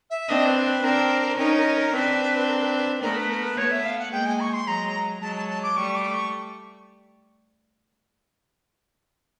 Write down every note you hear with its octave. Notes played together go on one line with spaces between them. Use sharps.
E5
C4 D4 D#5
B4
B4
C4 D4 A#4
C#4 D#4 A#4
A#4
A#4
C4 D4 B4
A#4
B4
B4
A3 B3 A#4
B4
A#4
B4
A3 B3 C#5
E5
F5
F#5
G#3 A#3 G5
G#5
C#6
C6
F#3 G#3 A#5
F#3 G#3 A5
A5
A5
D6
G3 A3 C#6
D6
C#6